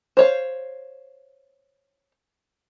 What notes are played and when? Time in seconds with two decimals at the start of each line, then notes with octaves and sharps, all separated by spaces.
0.17 C5 C#5 F5